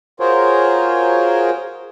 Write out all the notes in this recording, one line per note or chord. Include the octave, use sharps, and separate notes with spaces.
F4 F#4 G#4 A#4 C5 C#5